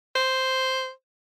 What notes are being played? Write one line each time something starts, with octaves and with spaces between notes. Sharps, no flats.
C5